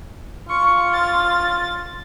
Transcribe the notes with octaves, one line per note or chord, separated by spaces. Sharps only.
F4 C#6
A6